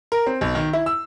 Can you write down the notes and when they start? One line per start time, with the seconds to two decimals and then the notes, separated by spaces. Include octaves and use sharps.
0.12 A#4
0.27 C4
0.41 B1
0.55 D#3
0.73 E4
0.86 E6